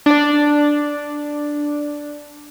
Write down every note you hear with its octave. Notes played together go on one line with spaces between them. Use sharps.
D4 D5